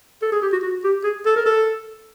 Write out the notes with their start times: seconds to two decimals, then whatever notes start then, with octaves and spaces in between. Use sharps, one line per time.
0.22 A4
0.32 G#4
0.42 G4
0.53 F#4
0.63 F#4
0.84 G4
1.04 G#4
1.26 A4
1.36 A#4
1.46 A4